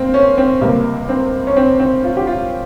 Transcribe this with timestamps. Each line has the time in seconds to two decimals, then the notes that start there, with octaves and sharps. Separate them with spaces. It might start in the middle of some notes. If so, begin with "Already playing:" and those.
Already playing: A#3 C4
0.14 C#4
0.38 C4
0.61 C#2 C3 G3 A#3
1.09 C4
1.47 C#4
1.57 C4
1.79 C4
2.04 F4
2.17 G4
2.27 F4